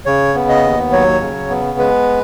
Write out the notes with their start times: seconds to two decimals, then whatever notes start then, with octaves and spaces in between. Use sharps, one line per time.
0.06 C#3 C#5
0.35 B3
0.49 D#5
0.63 D#2
0.92 F#3 C#5
1.21 C#3
1.50 B3
1.79 G#3 B4